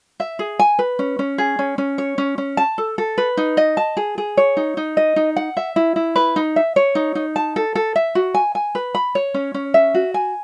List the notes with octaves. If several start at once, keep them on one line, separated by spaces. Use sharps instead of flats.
E5
G#4
G#5
B4
C#4
C#4
G#4
C#4
C#4
C#5
C#4
C#4
A5
A4
A4
B4
D#4
D#5
A5
G#4
G#4
C#5
D#4
D#4
D#5
D#4
F#5
E5
E4
E4
B4
D#4
E5
C#5
D#4
D#4
A5
A4
A4
E5
F#4
G#5
G#5
B4
B5
C#5
C#4
C#4
E5
F#4
G#5